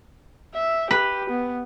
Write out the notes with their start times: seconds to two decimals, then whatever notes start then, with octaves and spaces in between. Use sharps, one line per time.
0.54 E5
0.91 G4 B4
1.30 B3